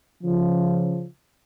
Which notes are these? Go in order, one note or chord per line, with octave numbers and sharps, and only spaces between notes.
C#3 F3